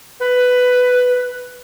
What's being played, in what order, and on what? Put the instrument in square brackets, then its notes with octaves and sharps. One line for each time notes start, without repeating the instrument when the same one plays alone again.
[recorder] B4